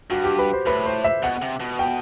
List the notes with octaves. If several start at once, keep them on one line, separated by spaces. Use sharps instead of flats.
G2 F#4
G4
B4
C5
A2 B4
C5
E5
B2 F#5
C3
B2
G5